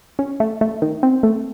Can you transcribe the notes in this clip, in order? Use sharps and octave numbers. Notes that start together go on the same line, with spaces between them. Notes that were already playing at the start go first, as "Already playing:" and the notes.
C#4
A3
A3
D#3
C4
A3